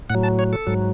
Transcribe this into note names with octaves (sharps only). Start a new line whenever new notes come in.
A2 F#3 F#5
A5
C#5
A4
G#2 F#3